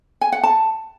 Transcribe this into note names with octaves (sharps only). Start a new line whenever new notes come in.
G#5
F#5
A5